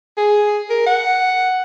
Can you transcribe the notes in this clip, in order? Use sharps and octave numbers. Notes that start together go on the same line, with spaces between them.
G#4
A#4
F#5